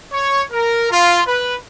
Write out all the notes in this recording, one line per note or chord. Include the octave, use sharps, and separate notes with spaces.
C#5
A#4
F4
B4